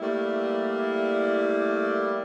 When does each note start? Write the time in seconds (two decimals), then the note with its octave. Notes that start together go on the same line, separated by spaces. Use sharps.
0.01 G3 A3 A#3 E4 D5